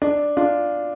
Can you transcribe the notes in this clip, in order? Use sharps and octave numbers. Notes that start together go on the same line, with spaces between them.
D4
D4 F4